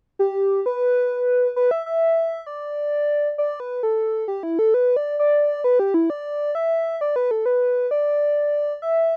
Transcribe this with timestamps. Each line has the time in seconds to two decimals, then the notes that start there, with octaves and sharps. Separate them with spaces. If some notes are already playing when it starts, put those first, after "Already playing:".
0.19 G4
0.66 B4
1.56 B4
1.71 E5
1.86 E5
2.46 D5
3.38 D5
3.60 B4
3.83 A4
4.28 G4
4.43 E4
4.59 A4
4.74 B4
4.96 D5
5.19 D5
5.64 B4
5.80 G4
5.94 E4
6.10 D5
6.55 E5
7.01 D5
7.16 B4
7.31 A4
7.46 B4
7.91 D5
8.82 E5